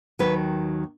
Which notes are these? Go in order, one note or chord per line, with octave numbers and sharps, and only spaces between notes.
D#2 D#3 F#3 B4